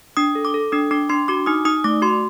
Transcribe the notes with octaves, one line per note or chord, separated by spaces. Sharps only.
D4 D#6
A4
D6
A4
D4 D#6
D4 D6
D4 C6
F#4 D6
D#4 D#6
D#4 D#6
A3 D6
F#4 C6